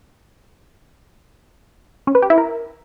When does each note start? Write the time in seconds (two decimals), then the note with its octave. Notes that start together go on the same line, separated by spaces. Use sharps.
2.07 C#4
2.15 B4
2.22 G4
2.30 E4
2.38 A#4